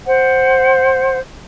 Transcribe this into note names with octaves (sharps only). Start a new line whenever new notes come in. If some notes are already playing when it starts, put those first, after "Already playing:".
C5 F#5